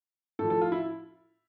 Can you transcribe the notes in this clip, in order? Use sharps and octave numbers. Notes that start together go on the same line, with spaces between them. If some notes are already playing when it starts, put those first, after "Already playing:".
A2 F3 A4
A4
F4
E4